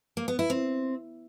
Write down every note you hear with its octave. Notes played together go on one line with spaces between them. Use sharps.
A#3
B3
E4
C4